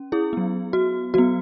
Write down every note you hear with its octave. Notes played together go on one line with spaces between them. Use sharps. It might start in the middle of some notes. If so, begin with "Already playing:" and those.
Already playing: C#4
E4 G#4
F#3 B3
F#4
F#3 B3 F#4